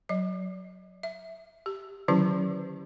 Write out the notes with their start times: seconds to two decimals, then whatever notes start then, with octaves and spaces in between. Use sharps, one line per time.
0.09 F#3 D#5
1.03 E5
1.66 G4
2.08 D3 D#3 F#3 C#4 E4 G4